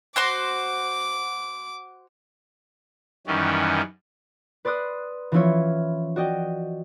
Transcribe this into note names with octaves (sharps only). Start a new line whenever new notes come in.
F#4 C5 C6 D6
F#2 D#3 E3 G3 C#4
B4 D5 C6 D#6 F#6
E3 F3 C#4 E4 F4 C#5
F#4 D5 D#5 G5